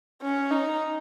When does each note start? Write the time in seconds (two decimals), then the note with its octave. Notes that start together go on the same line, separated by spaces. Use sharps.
0.22 C#4
0.51 D#4